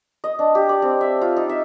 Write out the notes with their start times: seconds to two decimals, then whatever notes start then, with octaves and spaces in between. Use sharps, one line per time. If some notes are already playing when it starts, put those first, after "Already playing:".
0.24 D#5
0.39 D4
0.55 G4
0.69 D5
0.82 C4
1.01 E5
1.21 F4
1.37 D#4
1.49 E5